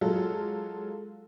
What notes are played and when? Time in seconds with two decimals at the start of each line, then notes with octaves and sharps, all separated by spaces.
0.01 F#3 G#3 F4 A4